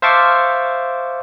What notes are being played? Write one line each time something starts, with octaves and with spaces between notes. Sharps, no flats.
C5 E5 F5 A5 C#6 D6